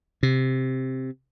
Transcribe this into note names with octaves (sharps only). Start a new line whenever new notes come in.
C3